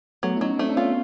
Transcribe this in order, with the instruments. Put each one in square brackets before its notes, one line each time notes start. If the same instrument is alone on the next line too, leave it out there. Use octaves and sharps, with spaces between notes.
[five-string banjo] F#3 [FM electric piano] A3 B3
[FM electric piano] E4
[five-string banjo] F#3 [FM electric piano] C#4 D#4
[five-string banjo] A3 [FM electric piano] C4 D4
[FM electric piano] D4
[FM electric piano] B3 C#4 [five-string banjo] F4